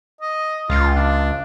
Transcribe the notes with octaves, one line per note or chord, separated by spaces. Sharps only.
D#5
C#2 F4
D4